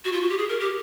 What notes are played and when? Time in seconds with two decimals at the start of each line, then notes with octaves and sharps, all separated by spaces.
0.05 F#4
0.13 F4
0.21 F#4
0.30 G4
0.38 G#4
0.49 A#4
0.60 G4